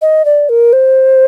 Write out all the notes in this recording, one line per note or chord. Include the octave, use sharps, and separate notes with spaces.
D#5
D5
A#4
C5